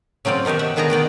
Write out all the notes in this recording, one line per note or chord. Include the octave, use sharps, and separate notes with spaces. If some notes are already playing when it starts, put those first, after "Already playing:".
C#3 F#3 C4 F4 D5
B2 D#3 D#4 G4 E5
E5 F#5
D3 D#3 B3 G#4 G5 A#5
D#3 B3 D5 G5